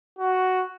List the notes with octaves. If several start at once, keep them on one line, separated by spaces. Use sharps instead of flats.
F#4